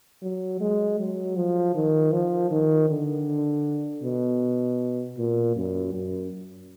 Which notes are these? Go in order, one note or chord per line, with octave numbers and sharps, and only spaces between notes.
F#3
G#3
F#3
F3
D#3
F3
D#3
D3
B2
A#2
F#2
F#2